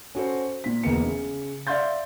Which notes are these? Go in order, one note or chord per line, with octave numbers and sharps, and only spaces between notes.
C#4 F#4 A4 C5
A#2 B6
E1 D2 A#3 B3 C#7
C#3
D5 E5 F5 C6 G6 A6